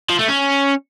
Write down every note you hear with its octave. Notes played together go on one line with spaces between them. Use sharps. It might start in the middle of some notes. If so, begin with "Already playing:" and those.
F3
A3
C#4